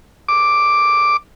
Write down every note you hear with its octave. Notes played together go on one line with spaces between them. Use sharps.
D6